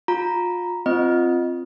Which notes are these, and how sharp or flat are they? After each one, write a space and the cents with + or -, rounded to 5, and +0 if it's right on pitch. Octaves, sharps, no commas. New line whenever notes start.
F4 +30 A#5 +0
C4 +0 F4 -10 D#5 +0